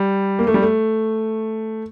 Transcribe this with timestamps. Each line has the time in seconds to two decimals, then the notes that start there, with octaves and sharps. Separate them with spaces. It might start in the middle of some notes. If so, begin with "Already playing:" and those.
Already playing: G3
0.39 A#3
0.47 A3
0.54 G3
0.62 A3